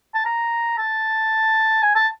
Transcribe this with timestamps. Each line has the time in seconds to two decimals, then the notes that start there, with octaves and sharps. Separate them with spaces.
0.14 A5
0.25 A#5
0.78 A5
1.83 G#5
1.95 A5